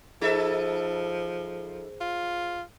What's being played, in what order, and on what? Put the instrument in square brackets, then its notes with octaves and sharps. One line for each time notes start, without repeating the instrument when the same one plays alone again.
[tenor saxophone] F3 [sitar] D#4 A4 E5 [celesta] G#4 C5
[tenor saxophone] F4